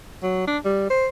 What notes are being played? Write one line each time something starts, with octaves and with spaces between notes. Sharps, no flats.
F#3
D4
G3
C5